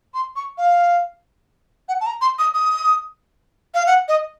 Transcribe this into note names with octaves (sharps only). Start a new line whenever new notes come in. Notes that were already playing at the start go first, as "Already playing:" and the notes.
C6
C#6
F5
F#5
A5
A#5
C6
D#6
D#6
F5
F#5
D#5